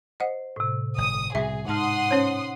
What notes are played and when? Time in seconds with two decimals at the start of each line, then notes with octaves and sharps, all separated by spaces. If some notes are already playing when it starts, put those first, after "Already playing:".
0.20 C5 D#5 F#5
0.56 A2 C3
0.98 G1 D#6
1.35 C2 B2 G#4 E5
1.68 G#2 G#3 D#4 F#5 A5 C6 D#6 F6
2.11 C#4 C5 C#5